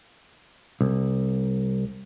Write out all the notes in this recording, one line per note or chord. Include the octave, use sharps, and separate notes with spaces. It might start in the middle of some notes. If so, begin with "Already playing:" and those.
C2